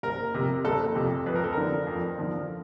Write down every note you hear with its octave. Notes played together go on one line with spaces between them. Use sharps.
F#1 A#4
F2 C3
F#1 A4
F2 C3
F2 B4
A#4
A4
D3 F3 A#4
F2
D3 F3